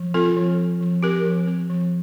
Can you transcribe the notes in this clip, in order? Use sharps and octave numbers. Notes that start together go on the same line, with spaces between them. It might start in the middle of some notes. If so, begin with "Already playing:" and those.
Already playing: F3
C4 F4 A4
F3
C4
F3
C4 G4 A#4
F3
C4
F3